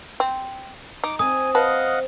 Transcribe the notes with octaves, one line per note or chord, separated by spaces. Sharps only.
C4
D#4 D6
C4 G#5 D#6
B4 D#5 F5 F#5 A5